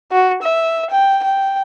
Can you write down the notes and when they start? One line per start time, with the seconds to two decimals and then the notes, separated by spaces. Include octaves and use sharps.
0.12 F#4
0.42 E5
0.90 G5
1.23 G5